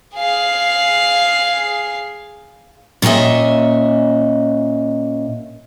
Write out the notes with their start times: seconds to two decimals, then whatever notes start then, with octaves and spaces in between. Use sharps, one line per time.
0.16 G#4 F5
3.02 A#2 C#4 F#4 D#5 E5